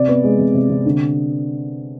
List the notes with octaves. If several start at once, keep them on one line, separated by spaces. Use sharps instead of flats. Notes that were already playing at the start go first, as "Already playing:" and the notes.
Already playing: C3 D5
B3
G#3
C3
C3
C3
D3